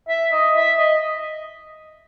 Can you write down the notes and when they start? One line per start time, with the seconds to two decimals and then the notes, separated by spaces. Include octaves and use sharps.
0.08 E5
0.32 D#5
0.55 E5
0.78 D#5